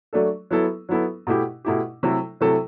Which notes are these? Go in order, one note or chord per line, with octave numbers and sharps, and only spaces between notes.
F#3 A3 D4 A4
F#3 B3 E4 A4
F#3 B3 E4 A4
B2 A3 E4 G4
B2 A3 E4 G4
C3 F#3 A3 E4 A4
C3 F#3 A3 E4 A4